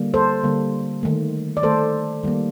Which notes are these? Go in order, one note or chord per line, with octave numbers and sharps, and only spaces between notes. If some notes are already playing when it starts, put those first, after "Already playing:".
Already playing: D3 G3 A#3
A4 C5
D3 G3 A#3
D#3 A3
D5
D#3 A3 A4 C5
D#3 G3 A#3